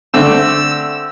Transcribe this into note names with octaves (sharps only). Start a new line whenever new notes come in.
D3 A3 C4 E6